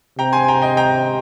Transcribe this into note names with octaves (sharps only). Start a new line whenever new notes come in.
C3 G5 A#5
G#5 C6
G5 A#5
D#5 G5
G5 A#5